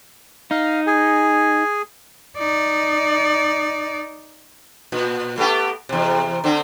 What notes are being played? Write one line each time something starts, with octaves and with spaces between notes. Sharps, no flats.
D#4 F5
G#4 G#5
D#4 D5
A#2
A3 B3 G4
E2 C3
D3 C4